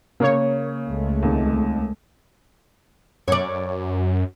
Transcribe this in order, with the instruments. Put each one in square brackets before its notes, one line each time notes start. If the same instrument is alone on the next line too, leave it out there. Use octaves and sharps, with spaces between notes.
[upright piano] C#3 [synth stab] A#3 C#5
[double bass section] C#2 G#3 A3
[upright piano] D#2 C3
[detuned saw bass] F#2 [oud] C#5 D5